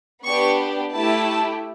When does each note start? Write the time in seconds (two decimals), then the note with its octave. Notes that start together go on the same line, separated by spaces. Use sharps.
0.24 B3 D4 G4 C#6
0.94 A3 E4 G4 A5